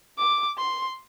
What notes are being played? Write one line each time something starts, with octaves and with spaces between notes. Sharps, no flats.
D6
C6